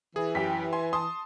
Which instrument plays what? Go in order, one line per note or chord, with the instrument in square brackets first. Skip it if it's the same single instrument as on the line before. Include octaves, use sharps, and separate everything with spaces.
[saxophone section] E3 [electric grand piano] G#4
[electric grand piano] F#2 [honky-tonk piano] G4 G5 B6
[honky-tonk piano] G#5 [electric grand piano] C6
[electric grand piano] A5 C6 [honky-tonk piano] D#6